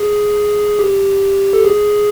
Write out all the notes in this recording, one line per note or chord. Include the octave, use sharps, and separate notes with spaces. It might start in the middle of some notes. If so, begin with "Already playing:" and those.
Already playing: G#4
G4
A4
G#4